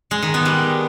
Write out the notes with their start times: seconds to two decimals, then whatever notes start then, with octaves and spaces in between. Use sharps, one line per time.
0.11 G#3
0.23 D#3
0.34 B3
0.45 G3